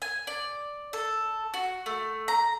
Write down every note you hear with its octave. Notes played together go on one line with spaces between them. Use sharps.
G#5
D5
A4
F#4
A3
A#5